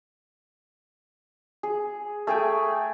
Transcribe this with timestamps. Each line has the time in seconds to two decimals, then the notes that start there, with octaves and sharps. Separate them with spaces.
1.63 G#4
2.27 A3 G#4 G5 G#5